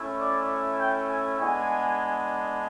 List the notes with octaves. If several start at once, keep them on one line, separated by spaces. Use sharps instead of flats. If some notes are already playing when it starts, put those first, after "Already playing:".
Already playing: A3 C#4 E4
D5
G5
G#5
G#3 B3 D4 G#5